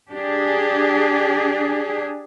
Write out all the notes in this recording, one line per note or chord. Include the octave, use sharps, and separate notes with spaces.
D4 G4 G#4